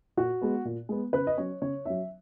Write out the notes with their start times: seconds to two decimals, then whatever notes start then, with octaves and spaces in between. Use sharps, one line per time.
0.17 A#2 F#4
0.42 G#3 B3
0.65 A#2
0.89 G#3 B3
1.13 C#3 B4
1.27 D#5
1.37 F#3 C#4 C#5
1.62 C#3 C#5
1.85 F#3 C#4 E5